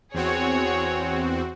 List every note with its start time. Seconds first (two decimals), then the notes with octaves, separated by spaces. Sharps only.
0.14 E2 C4 F#4 G#4 C#5